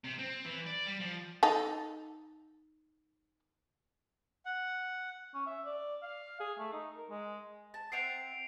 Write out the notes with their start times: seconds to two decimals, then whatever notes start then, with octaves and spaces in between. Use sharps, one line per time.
0.04 C3
0.19 C4
0.45 E3
0.67 D5
0.87 G3
1.00 F3
1.43 D#4 A4
4.45 F#5
5.34 C#4
5.46 E5
5.66 D5
6.02 F5
6.40 G#4
6.59 A3
6.73 D#4
6.97 A#4
7.10 G#3
7.74 A5
7.92 C4 E5 F#5 C7 D7 F7